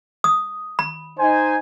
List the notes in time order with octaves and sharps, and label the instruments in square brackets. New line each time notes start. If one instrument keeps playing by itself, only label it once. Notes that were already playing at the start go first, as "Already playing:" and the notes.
[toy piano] D#6
B5
[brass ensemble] D#4 C5 G#5